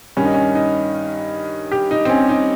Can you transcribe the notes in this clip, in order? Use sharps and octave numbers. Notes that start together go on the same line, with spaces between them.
G2 D#3 C#4
D#4
C#4
D#4
G4
D#4
C4
C#4
D#4